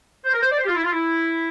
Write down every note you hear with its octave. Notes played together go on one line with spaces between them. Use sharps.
C5
A#4
C5
D5
C5
G4
F4
E4
F4
E4